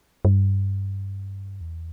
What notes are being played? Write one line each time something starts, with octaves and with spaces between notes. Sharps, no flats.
G2
E2